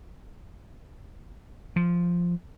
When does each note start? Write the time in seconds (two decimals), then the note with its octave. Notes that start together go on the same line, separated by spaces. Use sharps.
1.76 F3